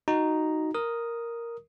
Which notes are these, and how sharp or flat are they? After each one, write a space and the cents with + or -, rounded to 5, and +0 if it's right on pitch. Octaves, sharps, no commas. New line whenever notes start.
D#4 +0 F#4 +0 A#5 +0
A#4 +0 D#6 +0